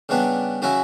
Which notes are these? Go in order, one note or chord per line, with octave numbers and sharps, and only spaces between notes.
C#3 G3 B3 D4
C#3 F#3 C#4 E4